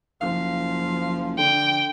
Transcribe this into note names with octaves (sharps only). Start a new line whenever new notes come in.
F#1 F3 F5
D3 G5